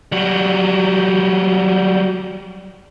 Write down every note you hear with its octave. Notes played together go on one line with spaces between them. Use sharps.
F#3 G3